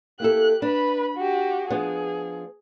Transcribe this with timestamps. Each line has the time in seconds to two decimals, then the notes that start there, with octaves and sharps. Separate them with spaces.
0.20 A#3 E4 G4 A4 F#6
0.62 D4 B4 B5
1.17 F#4 G4
1.70 F3 B3 D4 G#4